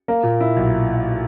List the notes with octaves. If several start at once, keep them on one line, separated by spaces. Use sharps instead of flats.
A#3
A#2
E4
B1